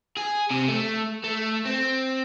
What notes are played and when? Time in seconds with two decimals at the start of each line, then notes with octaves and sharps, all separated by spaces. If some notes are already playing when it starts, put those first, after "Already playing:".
0.17 G#4
0.51 C3
0.68 A3
1.24 A3
1.66 C4